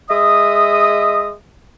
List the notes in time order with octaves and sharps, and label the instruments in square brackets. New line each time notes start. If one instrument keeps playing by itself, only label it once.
[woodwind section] G#3 D#5 E5 D#6